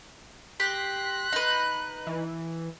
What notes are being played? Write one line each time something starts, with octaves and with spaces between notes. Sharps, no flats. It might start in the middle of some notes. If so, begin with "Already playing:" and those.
G4 C6 F#6 A#6 B6
D#4 B4
E3